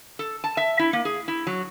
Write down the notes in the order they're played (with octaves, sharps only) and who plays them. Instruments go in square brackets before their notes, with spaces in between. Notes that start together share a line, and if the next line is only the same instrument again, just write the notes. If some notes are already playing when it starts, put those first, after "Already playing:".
[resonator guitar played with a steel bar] A4
A5
E5
E4
A#3
G#4
E4
F#3